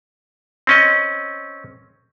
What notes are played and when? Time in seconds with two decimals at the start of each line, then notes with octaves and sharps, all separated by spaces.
0.67 C4 C#4 D#5